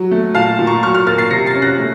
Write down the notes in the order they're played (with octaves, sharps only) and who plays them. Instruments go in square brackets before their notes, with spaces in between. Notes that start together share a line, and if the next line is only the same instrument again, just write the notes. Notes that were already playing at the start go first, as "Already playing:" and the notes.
Already playing: [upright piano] F#3
A3
A#2 F5 A5
A#2
A#5 C#6
F#3 C#6 F6
C#6 F6
A#3 F6 A6
A6 C7
C3 A#6 C#7
A6 C7
C#4
F#6 A#6
A3